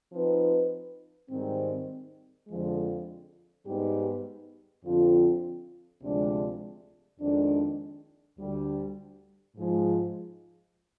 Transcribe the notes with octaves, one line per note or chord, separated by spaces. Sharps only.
F3 C4 D#4 B4
G#2 D#3 G3 C4
F2 D3 F3 G#3
G#2 G3 B3 D#4 G4
F2 D3 F3 C4 F4
D2 C3 F3 G#3 D4
F2 D#3 G#3 D4
D2 D3 G3
G#2 F3 G#3